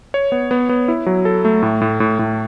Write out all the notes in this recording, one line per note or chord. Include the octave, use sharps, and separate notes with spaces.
C#5
B3
B3
B3
E4
F#3
A4
A3
A2
A2
A2
A2